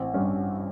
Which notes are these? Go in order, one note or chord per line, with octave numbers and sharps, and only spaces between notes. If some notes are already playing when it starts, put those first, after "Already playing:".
Already playing: A1 C4
G2 C#4